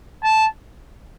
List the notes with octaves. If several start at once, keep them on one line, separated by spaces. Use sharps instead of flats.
A5